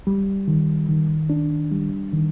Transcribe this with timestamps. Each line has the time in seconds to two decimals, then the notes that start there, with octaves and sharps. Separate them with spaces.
0.07 G3
0.48 D#3
0.89 D#3
1.30 D4
1.72 G3
2.13 D#3